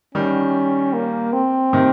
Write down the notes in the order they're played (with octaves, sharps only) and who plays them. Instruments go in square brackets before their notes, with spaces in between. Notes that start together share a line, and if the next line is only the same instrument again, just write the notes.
[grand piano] D#3 G3 [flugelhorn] C#4
[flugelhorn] A#3
C4
[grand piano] C3 D#3